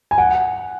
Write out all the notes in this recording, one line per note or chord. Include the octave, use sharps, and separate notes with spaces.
G#5
F#5